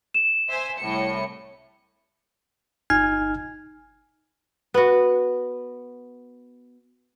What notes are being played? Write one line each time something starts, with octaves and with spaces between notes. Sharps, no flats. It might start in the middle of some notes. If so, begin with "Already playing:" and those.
E7
C5 E5 G#5
C2 A2 C#7
G1 D#4 G#5 F6 G#6
B3 F#4